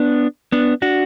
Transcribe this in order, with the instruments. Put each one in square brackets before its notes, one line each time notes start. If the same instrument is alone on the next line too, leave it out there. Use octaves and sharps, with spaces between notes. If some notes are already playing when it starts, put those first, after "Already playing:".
Already playing: [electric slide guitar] B3 D4
B3 D4
D4 F#4